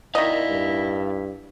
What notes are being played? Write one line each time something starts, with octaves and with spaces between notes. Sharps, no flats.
D#3 E4 D5 D#5 F5
G2